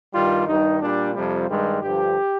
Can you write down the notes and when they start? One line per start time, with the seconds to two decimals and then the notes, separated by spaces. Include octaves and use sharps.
0.13 G2 D#3 G3 F4
0.47 G2 D#3 G3 D#4
0.81 A#2 G3 D4
1.15 F2 C3 F3 G3
1.50 G2 D#3 G3 G#3
1.83 G2 D3 F3 G4